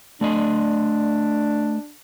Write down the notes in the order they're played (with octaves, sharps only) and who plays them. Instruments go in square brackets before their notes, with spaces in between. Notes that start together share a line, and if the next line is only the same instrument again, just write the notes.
[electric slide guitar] A3 D5 D#5 [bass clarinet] D4